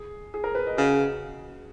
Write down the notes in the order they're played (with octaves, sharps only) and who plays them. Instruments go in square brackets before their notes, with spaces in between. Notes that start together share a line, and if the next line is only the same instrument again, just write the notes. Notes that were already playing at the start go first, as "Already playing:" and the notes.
Already playing: [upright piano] G#4
G#4
A#4
B4
D#5
[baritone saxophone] C#3 [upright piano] F#4